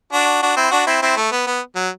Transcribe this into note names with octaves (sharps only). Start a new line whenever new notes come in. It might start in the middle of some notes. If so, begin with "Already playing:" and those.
D4 F#4
D4 F#4
C4 E4
D4 F#4
C4 E4
C4 E4
A3
B3
B3
F#3